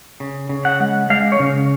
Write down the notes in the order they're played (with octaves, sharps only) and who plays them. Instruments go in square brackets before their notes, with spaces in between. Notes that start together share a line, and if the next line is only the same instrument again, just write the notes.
[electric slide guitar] C#3
C#3
F#5
G#3
G#3 F5
C#5
C#3